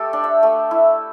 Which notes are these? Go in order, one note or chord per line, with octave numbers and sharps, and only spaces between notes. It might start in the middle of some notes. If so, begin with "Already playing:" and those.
Already playing: A3 G4 A4
D4
E5
A3
E4